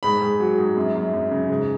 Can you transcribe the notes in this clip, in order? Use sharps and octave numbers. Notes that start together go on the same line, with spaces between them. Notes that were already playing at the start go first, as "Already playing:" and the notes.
G#2 B5
G#2
F#3
G#2
F#2
F#2
F#2
C#3
G#2